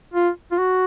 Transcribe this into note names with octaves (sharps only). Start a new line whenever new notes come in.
F4
F4
F#4